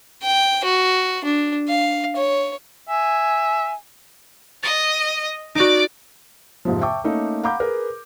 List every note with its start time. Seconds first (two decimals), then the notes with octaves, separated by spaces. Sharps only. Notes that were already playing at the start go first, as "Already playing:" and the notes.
0.22 G5
0.64 F#4
1.24 D4
1.68 F5
2.16 C#5
2.89 E5 G#5
4.63 D#5 A6
5.55 D#4 F#4 D5 D6
6.65 F2 G#2 C3 F3
6.81 E5 G5 A5 C#6 D6
7.04 A3 A#3 C#4 D#4
7.43 F5 F#5 A#5 B5 D6 G6
7.60 G#4 A#4 B4